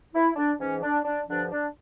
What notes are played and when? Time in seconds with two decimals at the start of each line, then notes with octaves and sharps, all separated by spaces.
0.14 E4
0.36 D4
0.59 G#2 E3 C#4
0.82 D4
1.05 D4
1.27 G2 D3 F3 D4
1.51 D4